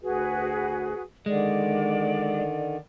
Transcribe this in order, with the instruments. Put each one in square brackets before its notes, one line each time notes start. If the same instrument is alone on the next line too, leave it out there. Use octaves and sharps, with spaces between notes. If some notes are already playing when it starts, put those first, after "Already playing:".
[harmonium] D2 [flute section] F#4 G#4 B4
[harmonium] D3 D#3 [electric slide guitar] G#3 [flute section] D5